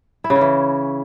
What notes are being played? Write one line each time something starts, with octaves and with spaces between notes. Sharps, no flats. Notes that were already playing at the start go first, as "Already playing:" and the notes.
E4
C#3
C#4
E3